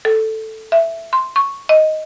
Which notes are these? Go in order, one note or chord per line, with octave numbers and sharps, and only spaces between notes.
A4
E5
C6
C#6
D#5